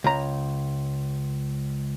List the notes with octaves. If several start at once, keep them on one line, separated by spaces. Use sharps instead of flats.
C#2 A#5